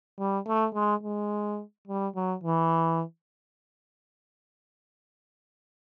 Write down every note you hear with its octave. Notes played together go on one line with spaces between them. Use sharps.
G3
A3
G#3
G#3
G3
F#3
E3